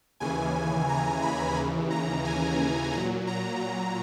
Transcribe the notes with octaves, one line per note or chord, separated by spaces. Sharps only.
D#2 C#3 E3 G#5
A#5
B5
D#2 C#3 E3
A#5
G#5
A#2 F#3 A#5
A#5